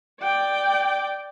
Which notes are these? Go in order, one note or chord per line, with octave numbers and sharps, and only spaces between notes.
D5 G5